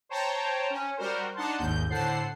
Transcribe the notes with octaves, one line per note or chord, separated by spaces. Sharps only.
C5 C#5 G5 A5 A#5
C#4
G3 F#4 A#4 C5
D4 D#4 F#5 A5 C6
G#1 D#2 G6
A2 D3 C5 F#5 A5 C7